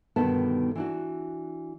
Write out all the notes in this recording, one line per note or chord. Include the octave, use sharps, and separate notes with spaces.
G2 B2 D3 D#3 B3 A5
E3 D4 F#4